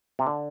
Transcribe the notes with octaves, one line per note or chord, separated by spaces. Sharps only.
C3
D3